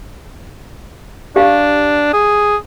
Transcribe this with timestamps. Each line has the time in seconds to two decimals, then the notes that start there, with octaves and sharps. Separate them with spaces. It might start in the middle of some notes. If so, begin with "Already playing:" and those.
1.36 D4 G4 F5
2.13 G#4